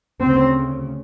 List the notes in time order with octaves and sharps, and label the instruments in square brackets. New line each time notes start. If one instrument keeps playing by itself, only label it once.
[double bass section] D2 C#3 C4